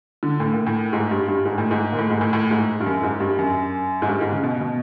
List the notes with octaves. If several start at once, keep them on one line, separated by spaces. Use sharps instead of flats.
D3
A2
A#2
A2
G#2
G2
G2
G#2
A2
G#2
A#2
A2
G#2
A2
A2
G#2
G2
F#2
G#2
G2
F#2
G#2
G2
G#2
C#3
B2
B2